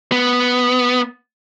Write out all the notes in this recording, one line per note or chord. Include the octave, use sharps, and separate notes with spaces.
B3